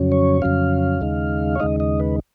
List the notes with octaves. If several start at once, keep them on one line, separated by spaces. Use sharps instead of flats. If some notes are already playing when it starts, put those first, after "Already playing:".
Already playing: F2 C#3 F#3 C#4
C#5
F2 C#3 F#3 C#4 F5
D#2 C#3 G#3 D#4
C#5
D#2 C#3 G#3 D#4 D#5
D#5
B4